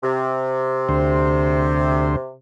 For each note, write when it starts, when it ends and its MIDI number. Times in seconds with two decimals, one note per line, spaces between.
0.03 2.34 48
0.89 2.16 38
0.89 2.16 72